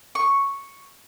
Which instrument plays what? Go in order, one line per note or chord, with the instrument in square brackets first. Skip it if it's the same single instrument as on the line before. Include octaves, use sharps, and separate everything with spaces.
[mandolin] C#6